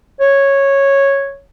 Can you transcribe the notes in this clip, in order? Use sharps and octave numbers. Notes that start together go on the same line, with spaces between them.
C#5